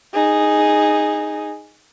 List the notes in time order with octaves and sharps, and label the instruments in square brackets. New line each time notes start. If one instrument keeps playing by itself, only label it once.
[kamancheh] D#4 G#4